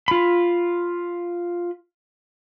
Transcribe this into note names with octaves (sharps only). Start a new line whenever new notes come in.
F4 B5